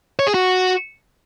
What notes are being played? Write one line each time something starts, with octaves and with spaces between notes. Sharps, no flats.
C#5
G#4
F#4